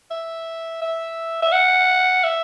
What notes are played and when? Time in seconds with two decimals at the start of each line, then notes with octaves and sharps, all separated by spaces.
0.11 E5
0.82 E5
1.42 E5
1.52 F#5
2.24 E5